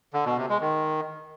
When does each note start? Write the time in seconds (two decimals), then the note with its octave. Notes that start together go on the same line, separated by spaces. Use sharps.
0.14 D3
0.25 B2
0.37 C3
0.49 G#3
0.61 D#3